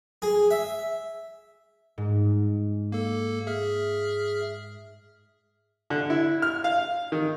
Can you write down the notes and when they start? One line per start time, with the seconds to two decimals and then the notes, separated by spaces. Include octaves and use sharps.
0.22 G#4
0.51 E5
1.98 G#2
2.92 A#3 A4
3.47 G#4 E5 F6
5.90 D3
6.10 E4
6.42 F6
6.64 F5
7.12 D#3